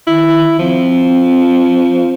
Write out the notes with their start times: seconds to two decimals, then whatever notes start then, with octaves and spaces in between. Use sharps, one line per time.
0.07 D#3 E4
0.59 F3 C4